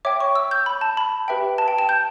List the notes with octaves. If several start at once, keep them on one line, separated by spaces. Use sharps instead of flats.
C#5 E5 G5 D6
C#6
E6
G6
B5
A5
B5
G4 B4 E5 G5
A5
G5
A5
G6